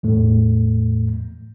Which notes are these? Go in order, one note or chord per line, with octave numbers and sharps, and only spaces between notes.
E2 A2 A3